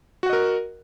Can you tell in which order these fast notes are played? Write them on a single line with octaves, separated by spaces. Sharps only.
F#4 F#5 D#5 A#4